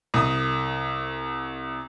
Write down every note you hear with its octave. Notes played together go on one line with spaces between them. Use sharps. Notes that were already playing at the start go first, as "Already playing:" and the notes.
C2 D#6